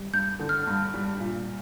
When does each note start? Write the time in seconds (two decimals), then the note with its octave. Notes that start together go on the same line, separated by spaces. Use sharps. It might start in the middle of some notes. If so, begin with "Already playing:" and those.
Already playing: G3
0.13 G2 G6
0.39 D3
0.49 F6
0.67 G2
0.94 G3
1.20 A#2